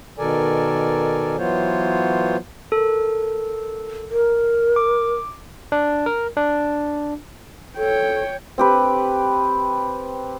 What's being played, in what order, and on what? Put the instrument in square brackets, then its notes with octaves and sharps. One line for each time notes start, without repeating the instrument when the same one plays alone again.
[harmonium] B2 D#3 A4 A#4 D5 G#5
E3 F#3 B3 F4 C5 C#5
[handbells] A4 A#4
[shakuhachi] A#4
[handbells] D6
[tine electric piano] D4
A#4
D4
[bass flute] A4 [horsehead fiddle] C#5 G5
[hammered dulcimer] C4 G4 B4